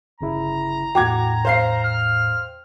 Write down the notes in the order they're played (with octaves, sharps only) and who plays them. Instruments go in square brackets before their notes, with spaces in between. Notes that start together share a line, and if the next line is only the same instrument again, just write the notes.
[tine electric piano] G1 C#3 E4 [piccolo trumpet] A#5
[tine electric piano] E2 A2 [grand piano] F#4 D6 G#6 [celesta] G5
[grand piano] C5 F5 C7
[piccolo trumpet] F6